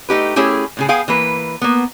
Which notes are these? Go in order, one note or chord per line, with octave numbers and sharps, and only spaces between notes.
A3 D#4 G4 B4
A3 C#4 E4 G4 G#4
A2 C#3 G#4
B3 G#4 F5 G5 G#5
E3 A#3 B4
A#3 B3